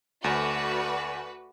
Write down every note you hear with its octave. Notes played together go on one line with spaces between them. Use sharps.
D2 A3 F#4 B4 D5